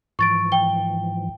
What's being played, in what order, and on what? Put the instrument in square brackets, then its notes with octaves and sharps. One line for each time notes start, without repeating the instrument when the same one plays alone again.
[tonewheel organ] G#2 E3 F3 [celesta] C#6 A6 D7
[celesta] G5 G7